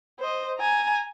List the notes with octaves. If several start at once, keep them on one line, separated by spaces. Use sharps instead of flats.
C5 D#5
G#5 A#5